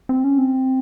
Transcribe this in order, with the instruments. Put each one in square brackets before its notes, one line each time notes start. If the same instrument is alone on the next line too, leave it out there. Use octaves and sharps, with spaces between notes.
[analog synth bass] C4
C#4
C4